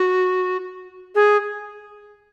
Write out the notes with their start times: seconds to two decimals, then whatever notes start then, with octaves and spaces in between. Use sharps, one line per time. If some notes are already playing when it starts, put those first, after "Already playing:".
Already playing: F#4
1.15 G#4